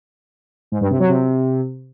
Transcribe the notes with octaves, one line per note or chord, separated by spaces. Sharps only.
G#2
G2
C3
F#3
C3